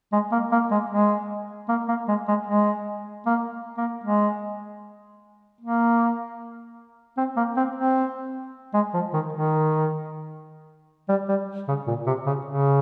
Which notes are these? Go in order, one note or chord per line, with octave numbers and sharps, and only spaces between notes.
G#3
A#3
A#3
G#3
G#3
A#3
A#3
G#3
G#3
G#3
A#3
A#3
G#3
A#3
C4
A#3
C4
C4
G#3
F3
D#3
D#3
G3
G3
C#3
A#2
C3
C#3
C#3